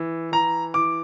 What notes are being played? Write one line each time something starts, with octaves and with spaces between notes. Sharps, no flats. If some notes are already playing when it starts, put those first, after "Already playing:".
Already playing: E3
E3 A#5
E3 D6